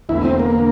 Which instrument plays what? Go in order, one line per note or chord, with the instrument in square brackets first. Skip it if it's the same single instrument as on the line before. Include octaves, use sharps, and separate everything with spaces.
[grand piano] E1 E2 D3 A3 [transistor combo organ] E4
[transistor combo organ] C4
A#3
[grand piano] D3